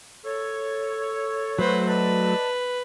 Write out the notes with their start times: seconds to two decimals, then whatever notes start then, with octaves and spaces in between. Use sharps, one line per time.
0.25 A4 C#5
1.59 F#3 A3 F#4 B4 C5
1.88 B4 D5 D#5 A5